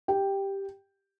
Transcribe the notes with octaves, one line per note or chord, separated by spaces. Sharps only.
G4 G5